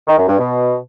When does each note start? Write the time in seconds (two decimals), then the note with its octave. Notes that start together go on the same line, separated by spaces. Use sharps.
0.07 D#3
0.18 F#2
0.28 G2
0.38 B2